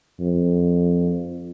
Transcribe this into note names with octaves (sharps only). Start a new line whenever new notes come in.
F2